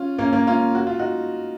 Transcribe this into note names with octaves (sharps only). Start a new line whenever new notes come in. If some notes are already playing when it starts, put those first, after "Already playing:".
Already playing: C#4 F4
A#3 C#4
A#3 C#4
C#4 F4
F#4
F4
D#4 F#4